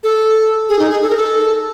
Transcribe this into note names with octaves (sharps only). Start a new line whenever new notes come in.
A4
G#4
D#4
G#4
A4
A#4
A4